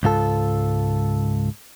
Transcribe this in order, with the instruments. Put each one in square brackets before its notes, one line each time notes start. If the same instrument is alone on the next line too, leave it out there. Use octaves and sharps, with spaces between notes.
[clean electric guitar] C#2 G#2 F4 A4